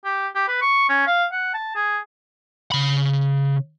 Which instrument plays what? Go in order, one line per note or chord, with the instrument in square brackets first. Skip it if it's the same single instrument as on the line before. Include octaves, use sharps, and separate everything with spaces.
[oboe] G4
G4
B4
C#6
C#4
F5
F#5
A5
G#4
[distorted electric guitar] C#3 B5